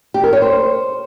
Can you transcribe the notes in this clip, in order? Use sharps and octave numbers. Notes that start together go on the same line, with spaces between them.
G4
A#4
C#5
C5